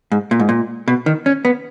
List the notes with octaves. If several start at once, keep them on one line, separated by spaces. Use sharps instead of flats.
G#2
A#2
G#2
A#2
B2
D#3
C#4
B3